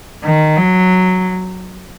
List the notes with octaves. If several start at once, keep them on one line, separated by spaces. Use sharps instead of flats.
D#3
F#3